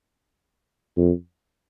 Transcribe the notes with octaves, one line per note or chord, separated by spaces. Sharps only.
F2